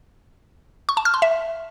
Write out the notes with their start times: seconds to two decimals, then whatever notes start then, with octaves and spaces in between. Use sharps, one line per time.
0.89 C#6
0.97 A5
1.05 F6
1.14 C6
1.22 E5